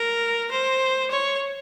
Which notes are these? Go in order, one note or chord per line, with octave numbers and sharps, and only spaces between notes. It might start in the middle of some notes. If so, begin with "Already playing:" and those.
Already playing: A#4
C5
C#5